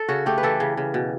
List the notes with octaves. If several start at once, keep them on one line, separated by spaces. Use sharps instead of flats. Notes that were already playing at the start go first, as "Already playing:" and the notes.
Already playing: A4
C#3 F#4
A3 G4
B4
E3 A4
C#3
C#3
B2